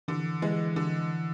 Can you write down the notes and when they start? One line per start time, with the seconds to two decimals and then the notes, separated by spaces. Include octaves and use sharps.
0.08 D3 E3
0.42 E3 G#3
0.76 D3